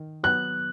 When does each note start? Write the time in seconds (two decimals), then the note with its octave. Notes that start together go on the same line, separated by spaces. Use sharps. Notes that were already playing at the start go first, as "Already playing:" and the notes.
Already playing: D#3
0.23 F#3 B3 F#6